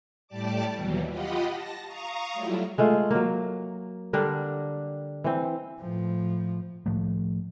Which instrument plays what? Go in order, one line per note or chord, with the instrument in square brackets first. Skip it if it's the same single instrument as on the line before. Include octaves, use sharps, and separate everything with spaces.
[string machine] A2 G3 G4 D5 A5 D6
D#2 B2 E3 F#3 G3
F4 G4 D#5 F#5 B5
A5 A#6
F5 A#5 C#6 D#6 F6
F#3 G3 A3 E4 F4
[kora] G#3 A3 F4
F#3 A#3
D3 G3 D4 A#4
E3 C4
[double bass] A2 F3
[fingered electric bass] A2 F3 A3